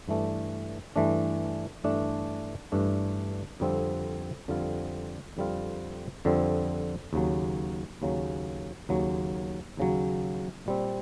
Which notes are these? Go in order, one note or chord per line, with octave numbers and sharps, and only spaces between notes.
G2 E3 A3 D4
G2 E3 A3 D4
G2 E3 A3 D4
G2 E3 A3 D4
F2 D3 G3 C4 F4
F2 D3 G3 C4 F4
F2 D3 G3 C4 F4
F2 D3 G3 C4 F4
D#2 C#3 F#3
D#2 C#3 F#3
D#2 C#3 F#3
D#2 C#3 F#3
A#2 G3 C4